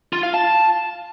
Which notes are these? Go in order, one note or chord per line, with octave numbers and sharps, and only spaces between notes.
F4
F5
A5